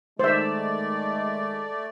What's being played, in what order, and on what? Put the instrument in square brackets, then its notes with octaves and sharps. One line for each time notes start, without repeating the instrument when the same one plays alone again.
[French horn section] D#3 G#3 [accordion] A3 D5 [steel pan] C5 E5